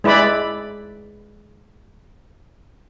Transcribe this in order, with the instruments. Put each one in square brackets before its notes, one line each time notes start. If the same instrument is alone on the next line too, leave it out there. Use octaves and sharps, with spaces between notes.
[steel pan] G#3 E4 B4 D5 B5